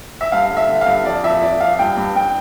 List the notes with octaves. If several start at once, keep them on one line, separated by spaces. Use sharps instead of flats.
E5
G2 F5
D3
E5
D3
F5
G2
F2 D5
F2 E5
F2 D5
F2 F5
G2 G5
G2
G2 G5